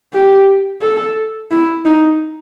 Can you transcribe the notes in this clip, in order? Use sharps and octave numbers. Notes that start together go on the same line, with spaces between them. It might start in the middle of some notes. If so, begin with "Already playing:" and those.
G4
A4
E4
D#4